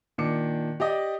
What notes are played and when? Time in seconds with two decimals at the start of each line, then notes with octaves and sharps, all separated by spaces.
0.18 A#2 D#3 D4 D6 C#7
0.80 G4 D5 D#5